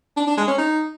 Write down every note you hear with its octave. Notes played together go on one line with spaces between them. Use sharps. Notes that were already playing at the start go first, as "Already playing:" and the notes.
D4
D4
G#3
C#4
D#4